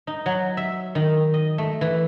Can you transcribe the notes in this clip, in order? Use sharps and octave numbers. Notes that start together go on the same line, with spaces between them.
D#4
F#3
E5
D#3
D#5
A3
E3